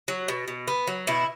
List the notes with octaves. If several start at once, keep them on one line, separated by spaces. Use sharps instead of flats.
F#3
B2
B2
B3
F#3
B2 E4